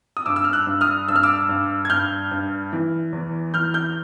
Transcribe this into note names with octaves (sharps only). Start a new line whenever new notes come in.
D#6
G2 D6 E6
E6
F6
E6 F#6
G2
D#6 F6
G2 E6
F6
D6 E6
G2
G#6
G2 F6 G6
G2
E3
E2
E3 F6 G6
F6 G6